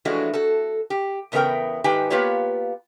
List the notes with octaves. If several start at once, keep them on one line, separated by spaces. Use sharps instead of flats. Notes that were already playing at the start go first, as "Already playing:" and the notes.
E3 F3 G#3 A3 D4 F#4
F#4 A4
G4
E2 C#3 B3 E4 A#4 G5
G#2 D#3 G4 B4 G5 G#5
A#3 B3 F4 G4 B4 C#5